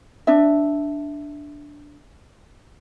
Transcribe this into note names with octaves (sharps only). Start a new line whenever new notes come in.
D4 E5